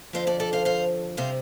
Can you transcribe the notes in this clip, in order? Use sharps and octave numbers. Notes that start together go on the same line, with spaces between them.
F2 D3 F3 C5 F5
A4 D5
A4 D5
C5 F5
C5 F5
C3 G3 C5 F5